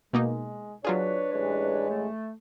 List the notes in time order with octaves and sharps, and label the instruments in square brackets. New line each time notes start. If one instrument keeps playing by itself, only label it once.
[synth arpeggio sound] B2 A#3 D#4 [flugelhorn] G#3
[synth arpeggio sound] F#3 F4 G#4 [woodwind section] D4 B4 [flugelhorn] C#5
[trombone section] A1 G#3 [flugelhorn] C#5
[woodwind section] A3